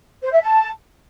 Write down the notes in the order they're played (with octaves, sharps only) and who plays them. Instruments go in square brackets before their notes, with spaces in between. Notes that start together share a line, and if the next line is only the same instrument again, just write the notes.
[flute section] C5
E5
A5